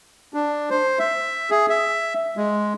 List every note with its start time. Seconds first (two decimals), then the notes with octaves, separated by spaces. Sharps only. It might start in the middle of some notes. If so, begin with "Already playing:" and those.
0.34 D4
0.70 C5
0.99 E5
1.50 G#4
1.70 E5
2.37 G#3